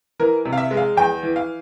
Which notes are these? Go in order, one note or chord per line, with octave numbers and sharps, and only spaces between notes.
E3 A#4
C3
F5
E5
G#3
F5
E2 G5
E3
F5